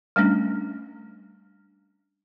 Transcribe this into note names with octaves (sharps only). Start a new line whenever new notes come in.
G3 A3 C#4 D4